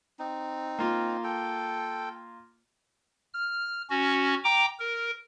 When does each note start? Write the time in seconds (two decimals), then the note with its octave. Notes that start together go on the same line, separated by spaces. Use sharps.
0.19 C4 D#4
0.79 A#3 F4
1.24 A4 G5
3.34 F6
3.90 C#4 F#4
4.44 G5 A#5 D6
4.80 A#4